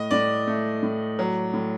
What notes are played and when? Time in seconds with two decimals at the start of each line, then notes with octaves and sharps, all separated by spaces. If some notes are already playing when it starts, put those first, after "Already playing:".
Already playing: A2 D#5
0.11 A2 D5
0.47 A3
0.83 A2
1.19 F#3
1.54 A2